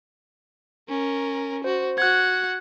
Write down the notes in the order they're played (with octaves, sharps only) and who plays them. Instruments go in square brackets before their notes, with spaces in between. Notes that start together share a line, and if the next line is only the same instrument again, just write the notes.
[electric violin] C#4 A#4
[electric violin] F#4 [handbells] C5
[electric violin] F#4 F#5 [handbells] F#6 G#6